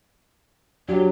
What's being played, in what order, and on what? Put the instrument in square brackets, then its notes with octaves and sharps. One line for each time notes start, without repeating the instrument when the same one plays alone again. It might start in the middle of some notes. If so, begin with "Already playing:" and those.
[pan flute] F#3 [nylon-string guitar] D4 F#4 G4